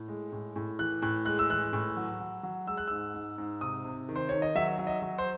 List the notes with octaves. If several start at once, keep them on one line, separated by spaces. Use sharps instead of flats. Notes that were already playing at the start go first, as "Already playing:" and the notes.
Already playing: A2
G#3
A2
A2
E3 F#6
A2 F#6
G#3 F#6
E6
E3 F#6
A2
F#3
F#3
F#3
G#3 E6
F#6
G#2 E6
G#2
G#2
C3 D#6
C3
D#3
C5
D#3 C#5
D#5
F#3 E5
F#3
D#5
F#3
C5